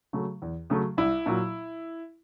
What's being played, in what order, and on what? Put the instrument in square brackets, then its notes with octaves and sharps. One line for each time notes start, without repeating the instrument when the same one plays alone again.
[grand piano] C#3 F#3 A3
E2
C#3 F#3 A3
C2 E4
A#2 F#3